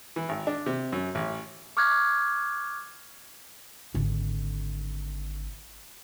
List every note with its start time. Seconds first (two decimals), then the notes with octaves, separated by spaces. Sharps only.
0.16 E3
0.29 G#1
0.47 D4
0.66 C3
0.92 F#2
1.15 A1
1.77 C#6 D6 F6 F#6 G#6
3.95 G#1 D3